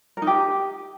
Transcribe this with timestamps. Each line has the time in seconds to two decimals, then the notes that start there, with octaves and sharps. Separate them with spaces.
0.17 A#4
0.22 D#4
0.27 G4